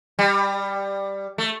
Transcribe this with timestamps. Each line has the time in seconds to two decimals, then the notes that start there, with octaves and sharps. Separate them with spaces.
0.19 G3
1.38 A3